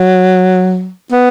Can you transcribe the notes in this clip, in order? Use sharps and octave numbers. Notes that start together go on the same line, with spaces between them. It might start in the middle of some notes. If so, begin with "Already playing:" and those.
Already playing: F#3
B3